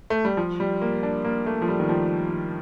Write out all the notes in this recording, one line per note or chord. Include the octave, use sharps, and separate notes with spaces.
A3
G3
F3
G3
A#3
D4
A#3
A3
F3
G3
D#3
F3